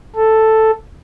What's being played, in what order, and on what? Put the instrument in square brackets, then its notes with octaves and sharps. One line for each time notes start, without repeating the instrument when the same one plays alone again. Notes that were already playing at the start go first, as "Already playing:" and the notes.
[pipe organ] A4